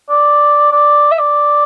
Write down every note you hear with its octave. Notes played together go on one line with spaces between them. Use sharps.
D5
D5
E5
D5